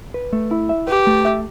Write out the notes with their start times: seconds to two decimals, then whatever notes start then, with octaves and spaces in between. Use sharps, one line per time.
0.14 B4
0.33 A3
0.51 E4
0.69 E5
0.88 G4 B4
1.07 A3
1.25 E5